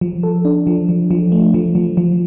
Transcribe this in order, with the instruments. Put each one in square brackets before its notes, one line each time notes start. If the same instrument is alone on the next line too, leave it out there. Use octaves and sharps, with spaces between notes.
[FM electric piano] F3
A4
D4
F3
F3
F3
A3
F3
F3
F3